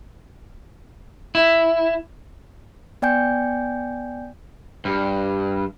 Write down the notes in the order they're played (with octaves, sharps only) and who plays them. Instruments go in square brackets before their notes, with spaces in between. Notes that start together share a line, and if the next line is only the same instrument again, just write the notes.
[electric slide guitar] E4
[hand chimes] B3 D5 G5 G#5 G6
[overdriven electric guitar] G2